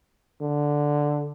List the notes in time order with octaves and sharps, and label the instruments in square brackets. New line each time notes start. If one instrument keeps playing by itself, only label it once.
[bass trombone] D3